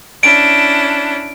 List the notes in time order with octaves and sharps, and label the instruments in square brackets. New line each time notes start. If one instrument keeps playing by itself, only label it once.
[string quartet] C#4 D4 E4 [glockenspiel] D7